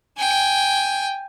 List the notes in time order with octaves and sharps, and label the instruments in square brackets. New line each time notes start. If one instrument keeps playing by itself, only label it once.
[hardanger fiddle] G5 G#5